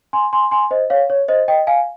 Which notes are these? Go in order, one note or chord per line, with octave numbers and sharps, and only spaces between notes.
G#5 C6
G#5 C6
G#5 C6
C5 D#5
C#5 F5
C#5
C5 D#5
D#5 G5
F5 G#5